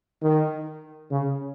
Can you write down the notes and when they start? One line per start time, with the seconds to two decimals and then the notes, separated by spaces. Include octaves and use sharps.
0.22 D#3
1.11 C#3